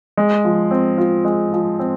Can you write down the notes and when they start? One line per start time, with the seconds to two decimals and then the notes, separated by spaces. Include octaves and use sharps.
0.17 G#3
0.45 F3
0.71 C4
0.98 F4
1.25 G#3
1.53 F3
1.79 C4